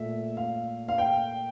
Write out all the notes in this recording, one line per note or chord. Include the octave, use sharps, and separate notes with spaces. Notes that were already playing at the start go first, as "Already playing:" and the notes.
Already playing: A#2 A3 E5
F5
F5
G5